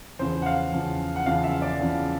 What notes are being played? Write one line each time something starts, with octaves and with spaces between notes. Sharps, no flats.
E2 C#3 F3 C5
F#5
F5
E2 C#3 F3
F#5
E2 C#3 F3 F5
E5
D5
E2 C#3 F3